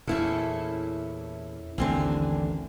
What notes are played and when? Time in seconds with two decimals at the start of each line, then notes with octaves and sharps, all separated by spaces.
0.07 E2 A#2 C#4 E4 A4
1.78 A1 D#2 D3 C4 G#5